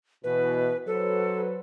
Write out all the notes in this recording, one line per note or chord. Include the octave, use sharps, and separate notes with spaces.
B2 E3 B4
F#3 A4 B4 C5